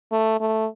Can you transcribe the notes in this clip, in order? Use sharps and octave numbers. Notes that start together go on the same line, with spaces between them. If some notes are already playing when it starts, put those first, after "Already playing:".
A3
A3